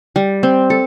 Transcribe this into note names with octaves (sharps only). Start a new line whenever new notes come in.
G3
C4
A4